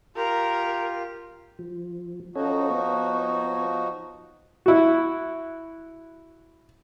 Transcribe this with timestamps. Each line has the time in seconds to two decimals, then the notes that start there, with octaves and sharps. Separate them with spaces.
0.16 F4 G4 A#4
1.59 F3
2.35 F3 C#4 D#4 F#4 A4 C#5
2.71 B3 C#5
4.66 E4 F#4